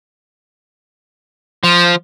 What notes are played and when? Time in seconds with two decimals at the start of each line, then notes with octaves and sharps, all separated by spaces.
1.64 F3